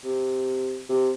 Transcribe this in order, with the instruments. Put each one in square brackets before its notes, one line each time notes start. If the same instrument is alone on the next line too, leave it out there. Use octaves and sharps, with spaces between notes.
[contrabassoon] C3
C3